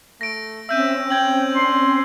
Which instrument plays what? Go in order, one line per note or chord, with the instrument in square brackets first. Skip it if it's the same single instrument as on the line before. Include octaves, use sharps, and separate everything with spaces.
[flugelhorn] A3 [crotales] A#6 D7
[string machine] C4 C#4 [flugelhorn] E5 [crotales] E6 G6 D#7
[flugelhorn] G5 [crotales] G6 G#6 F#7
[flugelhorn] D4 [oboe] C6